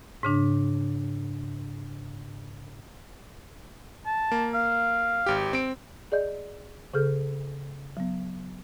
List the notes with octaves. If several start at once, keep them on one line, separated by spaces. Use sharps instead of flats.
G#2 C#3 D4
A5
A#3
F5
G#1 G4
C4 D7
G#4 D5 D#5 G6
C#3 G#4 A4 F6 G6
F#3 B3